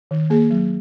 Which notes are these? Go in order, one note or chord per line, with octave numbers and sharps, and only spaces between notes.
D#3
A#3 G#4
F#3